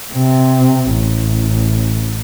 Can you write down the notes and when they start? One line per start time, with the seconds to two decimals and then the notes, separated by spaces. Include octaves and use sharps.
0.13 C3
0.93 A1